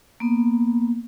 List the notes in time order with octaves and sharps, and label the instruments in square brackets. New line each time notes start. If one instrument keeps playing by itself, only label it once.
[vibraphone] A#3 B3